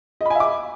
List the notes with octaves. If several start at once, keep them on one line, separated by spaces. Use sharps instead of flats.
D#5 E5 G#5 B5 D6